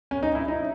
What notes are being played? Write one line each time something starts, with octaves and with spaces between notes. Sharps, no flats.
C#4
D#4
E4
D#4